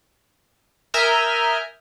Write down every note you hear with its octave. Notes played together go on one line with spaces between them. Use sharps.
A#4 E5 G#5 D#6 F6 G6